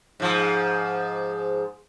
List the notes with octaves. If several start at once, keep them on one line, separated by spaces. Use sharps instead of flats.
G#2 F3